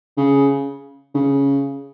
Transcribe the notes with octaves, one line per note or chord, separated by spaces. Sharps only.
C#3
C#3